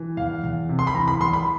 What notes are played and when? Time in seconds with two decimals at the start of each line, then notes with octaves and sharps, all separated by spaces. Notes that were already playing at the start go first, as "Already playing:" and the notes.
Already playing: E3
0.17 E2 F5
0.44 E2
0.69 C3
0.79 C6
0.87 B5
0.95 E3 A#5
1.08 B5
1.20 E2 C6
1.33 B5